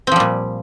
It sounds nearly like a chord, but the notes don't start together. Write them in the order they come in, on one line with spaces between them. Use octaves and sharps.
C4 F3 G3 A#2